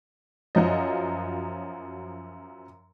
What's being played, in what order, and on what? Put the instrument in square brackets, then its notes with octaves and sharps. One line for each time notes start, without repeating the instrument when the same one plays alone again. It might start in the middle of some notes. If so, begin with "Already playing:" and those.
[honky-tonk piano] F#2 F3 F#3 D#5